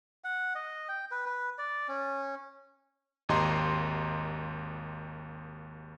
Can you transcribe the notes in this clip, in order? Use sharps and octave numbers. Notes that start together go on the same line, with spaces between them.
F#5
D#5
G5
B4
B4
D5
C#4
G#1 D#2 G4 D#5 A#5 C6